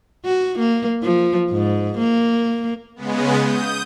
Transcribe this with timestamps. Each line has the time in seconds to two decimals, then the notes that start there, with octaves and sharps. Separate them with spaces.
0.25 F#4
0.58 A#3
1.03 F3
1.51 G#2
1.98 A#3
2.96 C#3 G#3 B3
3.38 D#6 G6